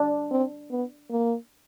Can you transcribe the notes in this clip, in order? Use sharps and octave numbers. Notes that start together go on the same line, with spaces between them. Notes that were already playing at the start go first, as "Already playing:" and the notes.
Already playing: D4
C4
B3
A#3